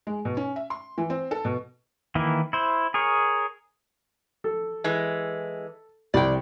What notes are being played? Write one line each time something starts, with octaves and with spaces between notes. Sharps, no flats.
G#3
B2
C#4
E5
C6
E3
C4
A4
B2
D#3 E3 A#3 E4
E4 C5
G#4 A#4 C#5
A4
E3 G#3
C2 D5 G5